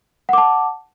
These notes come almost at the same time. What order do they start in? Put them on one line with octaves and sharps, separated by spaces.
F#5 D6 A5